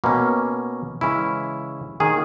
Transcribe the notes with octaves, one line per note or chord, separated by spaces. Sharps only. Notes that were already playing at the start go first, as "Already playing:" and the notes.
B2 A#3 C#4
C#3 E3 G#3 C#4 E4
D#3 A#3 C#4 G#4